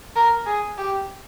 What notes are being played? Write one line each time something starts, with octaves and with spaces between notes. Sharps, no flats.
A#4
G#4
G4